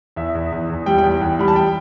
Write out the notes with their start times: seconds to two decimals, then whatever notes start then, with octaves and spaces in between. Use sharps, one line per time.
0.16 E2 E5
0.35 E2
0.52 E2
0.69 E2
0.86 G3 G5
0.98 G5
1.04 E2
1.21 E2
1.39 G3 B5
1.48 A5
1.56 G5